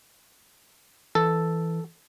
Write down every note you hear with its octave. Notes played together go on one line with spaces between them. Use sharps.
E3 A4